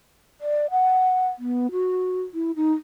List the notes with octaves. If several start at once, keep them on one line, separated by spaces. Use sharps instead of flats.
D5
F#5
B3
F#4
E4
D#4